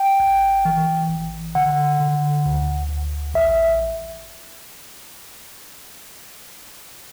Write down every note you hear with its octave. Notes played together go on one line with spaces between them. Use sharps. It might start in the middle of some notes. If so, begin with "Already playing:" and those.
Already playing: G5
A1
E3
A1
D3 F#5
D3
D2
D2
A1 E5